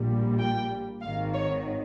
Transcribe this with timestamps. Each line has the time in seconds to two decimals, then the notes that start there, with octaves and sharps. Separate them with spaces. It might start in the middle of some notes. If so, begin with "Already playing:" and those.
Already playing: A#1 A#2 G3
0.39 G5
1.01 G#1 G#2 D#3 F5
1.33 C#5